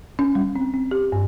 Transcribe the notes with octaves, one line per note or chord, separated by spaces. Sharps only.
C#4
G3
C4
C4
G4
G2